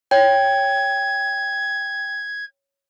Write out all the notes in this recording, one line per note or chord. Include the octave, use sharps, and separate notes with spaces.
C#5 G5 G#6